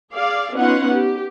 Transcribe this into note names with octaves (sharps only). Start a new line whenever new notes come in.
G#4 D5 F5
B3 C#4 D#4 F4 F#5
G4